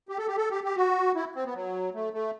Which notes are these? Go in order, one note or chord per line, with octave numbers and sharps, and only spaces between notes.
G4
A4
G4
A4
G4
G4
F#4
E4
C4
B3
F#3
A3
A3